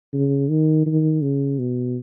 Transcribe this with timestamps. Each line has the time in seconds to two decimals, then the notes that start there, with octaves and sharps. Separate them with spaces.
0.13 C#3
0.50 D#3
0.86 D#3
1.22 C#3
1.59 B2